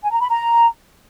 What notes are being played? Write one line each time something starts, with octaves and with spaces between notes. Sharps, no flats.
G#5
A#5
B5
A#5